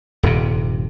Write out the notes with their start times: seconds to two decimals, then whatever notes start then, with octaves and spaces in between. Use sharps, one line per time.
0.23 D#1 G2 C3